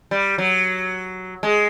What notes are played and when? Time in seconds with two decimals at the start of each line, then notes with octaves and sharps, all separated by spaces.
0.11 G3
0.38 F#3
1.43 G#3